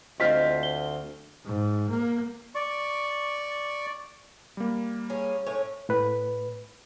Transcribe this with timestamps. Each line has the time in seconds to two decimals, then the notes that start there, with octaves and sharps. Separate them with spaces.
0.20 D2 C4 F4 D#5 F5 B6
0.63 G7
1.45 G#2
1.89 A#3
2.55 D5 C#6
4.57 G3 A#3
5.10 C#4 G#4
5.46 A2 C#4 C#5
5.89 A2 B4